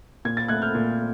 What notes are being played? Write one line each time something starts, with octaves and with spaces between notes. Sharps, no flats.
A#2 G#6
A6
A3 F#6 G#6
F6 G6
A#2